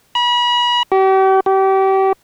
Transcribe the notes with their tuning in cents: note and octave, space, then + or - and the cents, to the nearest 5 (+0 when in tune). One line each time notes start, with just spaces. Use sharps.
B5 -35
G4 -40
G4 -30